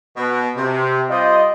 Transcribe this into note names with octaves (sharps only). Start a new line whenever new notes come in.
B2
C3
G3 F4 C5 D#5